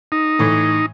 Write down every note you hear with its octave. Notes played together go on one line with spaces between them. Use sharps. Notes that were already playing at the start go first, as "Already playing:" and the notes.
D#4
A2 E3 C#6